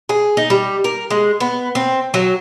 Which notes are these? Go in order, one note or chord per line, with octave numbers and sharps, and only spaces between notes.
G#4
D#4
G3
A#4
G#3
B3
C4
F#3